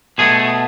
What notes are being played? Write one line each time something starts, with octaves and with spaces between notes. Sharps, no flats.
B2 A3 G#4